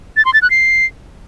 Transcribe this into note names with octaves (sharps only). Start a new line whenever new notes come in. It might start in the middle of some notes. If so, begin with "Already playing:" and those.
A6
C6
A6
F#6
C7